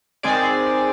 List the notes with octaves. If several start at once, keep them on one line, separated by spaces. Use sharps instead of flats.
D#3 G#3 C4 G#4 D5